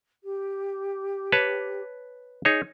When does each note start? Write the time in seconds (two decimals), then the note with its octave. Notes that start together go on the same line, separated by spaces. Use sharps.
0.24 G4
1.32 B4 C#5 A5
2.45 D#4 G#4 C#5